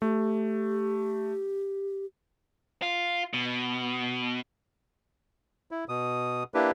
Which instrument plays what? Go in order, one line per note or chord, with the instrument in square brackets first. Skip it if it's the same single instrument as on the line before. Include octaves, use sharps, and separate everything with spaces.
[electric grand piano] A3 [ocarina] G4
[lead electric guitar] F4
B2
[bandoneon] E4
B2 D#6
A#3 D4 E4 G4 B4